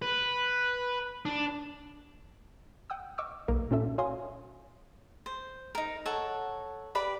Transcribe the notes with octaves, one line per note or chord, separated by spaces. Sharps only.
B4
D4
F#5 G5 D#6 E6
D#5 C#6 D6 E6 F6
B1 A#3 A#4
A#2 C#4 F4 A4 E5
F#4 C#5 F5 G#5 C6 D#6
C5
D#4 A#4
A4 C#5 F#5
G4 B4 D5 B5